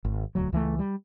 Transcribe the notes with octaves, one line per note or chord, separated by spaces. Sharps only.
G#1
E1 D2 F#3
C#2 E3 G#3 A3
G3